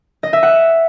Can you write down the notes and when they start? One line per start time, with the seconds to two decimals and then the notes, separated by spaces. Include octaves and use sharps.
0.23 D#5
0.33 E5
0.43 F#5